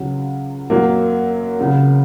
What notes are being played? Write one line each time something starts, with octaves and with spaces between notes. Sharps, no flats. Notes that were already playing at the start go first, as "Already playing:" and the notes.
Already playing: C#2 C#3 F#3
F#2 F#3 A#3
C#2 C#3 F#3